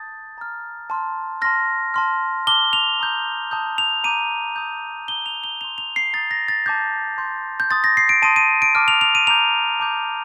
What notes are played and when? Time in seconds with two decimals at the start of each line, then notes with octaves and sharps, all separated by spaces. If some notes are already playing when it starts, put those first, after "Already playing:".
Already playing: A5 D#6 G6 A6
0.38 A#5 F6
0.90 A5 C6 F6
1.42 A5 C6 F6 A#6
1.94 A5 C6 F6
2.47 A5 D6 F6 G7
2.73 F7
3.00 A#5 D#6 G6
3.51 A5 D#6 G6
3.78 F7
4.04 A#5 D6 G6 D#7
4.56 A#5 D#6 G6
5.08 A#5 D#6 G6 G7
5.26 F7
5.44 G7
5.61 C6 G6 F7
5.78 F7
5.96 C7
6.13 A#5 D#6 G6 A6
6.31 A#6
6.48 A6
6.66 A5 D6 G6
7.18 C6 G6
7.60 G6
7.71 C6 D#6 G6 A6
7.84 A#6
7.97 C7
8.09 D7
8.22 A5 C6 D#6 D#7
8.36 D#7
8.62 D7
8.75 A5 D6 F6
8.88 F7
9.01 F7
9.15 D#7
9.27 A#5 D6 G6 F7
9.80 A5 D6 G6